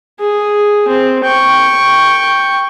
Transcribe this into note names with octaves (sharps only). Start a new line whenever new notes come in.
G#4
C4
G5 C#6